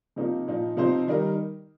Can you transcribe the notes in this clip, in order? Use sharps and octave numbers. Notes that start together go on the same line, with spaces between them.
C3 F3 A#3 D#4
A#2 F3 D#4
C3 F3 D#4 C5
D#3 G3 D#4 A#4